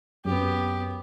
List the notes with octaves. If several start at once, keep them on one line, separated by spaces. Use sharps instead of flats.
F#2 B3 G4